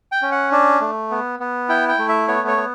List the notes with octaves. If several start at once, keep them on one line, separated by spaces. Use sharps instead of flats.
G5
C#4
F#5
D4
A3
B3
B3
E4 G5
G5
A3
E5
B3 C#5
C#5
B3